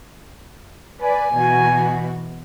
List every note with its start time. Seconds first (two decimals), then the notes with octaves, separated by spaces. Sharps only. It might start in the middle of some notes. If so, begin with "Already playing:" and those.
1.02 B4 D5 G#5
1.34 B2 E3 F#4